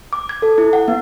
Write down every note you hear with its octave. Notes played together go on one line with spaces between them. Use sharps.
D6
G#6
A4
E4
F#5
B3